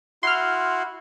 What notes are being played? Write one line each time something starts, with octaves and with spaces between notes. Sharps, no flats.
E4 F#4 C6 F6